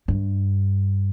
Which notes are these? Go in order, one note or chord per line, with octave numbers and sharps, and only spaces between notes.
G2